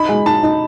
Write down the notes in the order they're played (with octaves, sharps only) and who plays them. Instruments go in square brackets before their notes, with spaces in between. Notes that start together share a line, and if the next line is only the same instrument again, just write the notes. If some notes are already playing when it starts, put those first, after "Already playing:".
Already playing: [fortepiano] D#4 [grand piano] B5
[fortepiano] G#3
[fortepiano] D#4 [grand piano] A5
[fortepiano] D#4